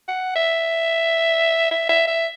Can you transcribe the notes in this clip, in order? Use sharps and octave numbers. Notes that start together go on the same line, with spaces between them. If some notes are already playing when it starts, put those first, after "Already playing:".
F#5
E5
E5
E5
E5